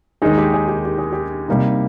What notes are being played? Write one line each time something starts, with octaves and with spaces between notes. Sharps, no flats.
D#2 D#3 G#3 D#4 G#4
G4
G#4
G4
G4
G#4
G4
C3 G3 A#3 D#4